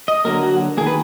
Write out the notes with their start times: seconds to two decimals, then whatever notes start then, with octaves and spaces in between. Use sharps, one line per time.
0.08 D#5
0.25 D3 F#3 A#3 A#4
0.43 F#4
0.77 D#3 A#3 G#4
0.87 B4